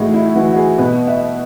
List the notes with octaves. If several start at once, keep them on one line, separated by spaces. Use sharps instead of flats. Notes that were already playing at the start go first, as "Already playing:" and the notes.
Already playing: A2 E3 D#4 E4 F#4 G#4
E4
E3 F#4
F#4
G#4
B2 B4
E5